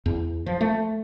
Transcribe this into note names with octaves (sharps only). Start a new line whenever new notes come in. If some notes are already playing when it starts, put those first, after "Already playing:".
E2
F3
A3